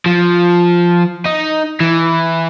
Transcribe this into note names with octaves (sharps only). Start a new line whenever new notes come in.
F3
D#4
E3